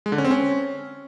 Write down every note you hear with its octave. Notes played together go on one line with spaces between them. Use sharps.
G#3
D3
C#4
C4
C#4